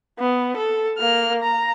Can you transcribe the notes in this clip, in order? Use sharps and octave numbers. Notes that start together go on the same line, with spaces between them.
B3
A4
A#3 F6
A#5